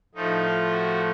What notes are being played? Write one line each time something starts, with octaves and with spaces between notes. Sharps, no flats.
A2 F3 A3 D#4
F4
F#4